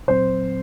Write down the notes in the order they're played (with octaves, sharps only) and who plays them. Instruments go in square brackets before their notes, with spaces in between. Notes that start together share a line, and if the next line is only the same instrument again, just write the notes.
[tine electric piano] A#2 F#3 C4 [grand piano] C5